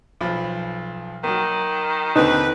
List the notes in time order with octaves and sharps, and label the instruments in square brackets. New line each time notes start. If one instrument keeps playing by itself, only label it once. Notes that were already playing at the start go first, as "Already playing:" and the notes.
[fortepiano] B1 F3 B5
[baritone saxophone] D#3 [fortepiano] F#3 A#3
[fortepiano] D#2 D3 C4 [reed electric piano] D#4 [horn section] B4